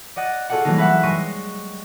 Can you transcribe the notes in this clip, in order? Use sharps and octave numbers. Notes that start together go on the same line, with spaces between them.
D5 D#5 F#5 D#6 A6
F4 F#4 G#4 A4 D5 F#5
E3 F#3 G3 A3 A#3 D#4
B4 E5 F#5
G3 G#3 C6 C#6 A#6 D#7